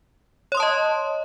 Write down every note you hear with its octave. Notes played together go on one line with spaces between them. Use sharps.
C#5 D#5 A5 C6 D#6